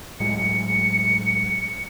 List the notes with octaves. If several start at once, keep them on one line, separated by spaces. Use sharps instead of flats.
A2 F#3 G#3 C#7